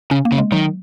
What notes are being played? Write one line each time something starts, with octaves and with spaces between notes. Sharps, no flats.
C#3 C#4
A#3
C#3
G#3
D#3 F#3